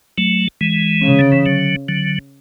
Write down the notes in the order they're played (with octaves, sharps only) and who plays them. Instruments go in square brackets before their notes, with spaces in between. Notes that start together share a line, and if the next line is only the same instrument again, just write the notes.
[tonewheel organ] F#3 A3
E3 G#3
[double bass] C#3
[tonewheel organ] D3
E3
D3 F#3
D3 F#3